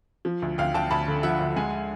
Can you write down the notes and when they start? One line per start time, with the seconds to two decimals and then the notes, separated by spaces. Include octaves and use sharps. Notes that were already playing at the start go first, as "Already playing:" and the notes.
0.25 F3
0.42 D2
0.58 D2 F5 G5
0.74 D2 G5 A5
0.91 D2 A5 B5
1.07 D3
1.23 F3 E5 F#5
1.40 D2
1.56 G#3 F#5 G#5